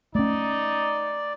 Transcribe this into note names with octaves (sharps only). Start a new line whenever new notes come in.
A3 C#4 D#4 D5